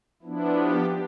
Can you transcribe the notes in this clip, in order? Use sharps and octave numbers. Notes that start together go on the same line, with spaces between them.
F3 B3 D4 E4
G4